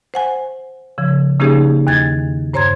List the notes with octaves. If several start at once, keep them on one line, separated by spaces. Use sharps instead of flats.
C5 F#5 G#5
C#3 F3
C#3 A#3 C#4 D#4 G4 G#4
E2 D#3 G#6 A6
G2 C5 C#5 A#5 C6 G#6